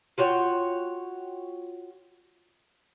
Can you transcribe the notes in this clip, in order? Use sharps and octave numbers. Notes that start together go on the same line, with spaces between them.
F4 F#4 C#5 G5